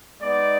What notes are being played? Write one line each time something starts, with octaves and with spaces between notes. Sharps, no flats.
G#3 B3 D#4 D5